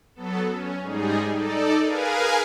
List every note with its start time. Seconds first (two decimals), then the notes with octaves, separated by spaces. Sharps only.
0.15 F#3 B3 A4
0.50 C#4
0.82 G#2 G3 D#4 G#4
1.33 D#4 A4 D5
1.83 G#4 A#4 B4 F5 G#5